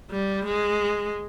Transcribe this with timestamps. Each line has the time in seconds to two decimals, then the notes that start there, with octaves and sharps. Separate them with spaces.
0.10 G3
0.45 G#3